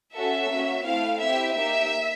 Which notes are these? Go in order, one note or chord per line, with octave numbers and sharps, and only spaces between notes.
C#4 F#4 A4 E5
A#3 C#4 F#4
A3 C4 E4 F5
C4 E4 G4 E5
A#3 D#4 G4 E5